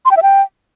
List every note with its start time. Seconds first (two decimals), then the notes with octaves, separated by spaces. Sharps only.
0.05 C6
0.11 G5
0.17 E5
0.23 G5